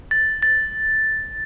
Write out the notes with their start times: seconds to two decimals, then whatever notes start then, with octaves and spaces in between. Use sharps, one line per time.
0.11 A6
0.43 A6